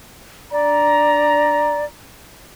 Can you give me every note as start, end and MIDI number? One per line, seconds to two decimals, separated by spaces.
0.52 1.86 62
0.52 1.85 74
0.52 1.86 82